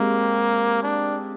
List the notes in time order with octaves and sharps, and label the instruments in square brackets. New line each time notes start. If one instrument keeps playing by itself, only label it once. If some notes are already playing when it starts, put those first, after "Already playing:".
Already playing: [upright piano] G#3 C4 G4 [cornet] A#3
[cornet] D4